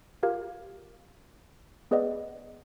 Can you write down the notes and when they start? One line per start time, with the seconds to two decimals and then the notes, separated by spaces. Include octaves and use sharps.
0.23 F4 G4 A#4 F5 G#6
1.91 B3 G#4 B4 D5 D#5 F#5